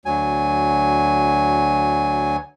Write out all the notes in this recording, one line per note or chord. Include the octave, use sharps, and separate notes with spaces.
D2 F#3 G#5